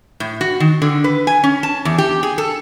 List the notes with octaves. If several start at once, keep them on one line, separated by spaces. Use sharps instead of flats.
A2
F#4
D#3
D3
B4
G#5
C#4
A5
E2
G4
G#4
A4